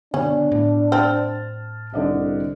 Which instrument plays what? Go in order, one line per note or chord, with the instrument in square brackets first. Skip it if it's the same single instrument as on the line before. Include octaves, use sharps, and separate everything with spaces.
[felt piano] B2 [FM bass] D3 [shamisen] C#4 [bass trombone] D4
[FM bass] A2
[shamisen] C4 [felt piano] A5 F6
[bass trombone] C2 [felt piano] D3 D5 D#5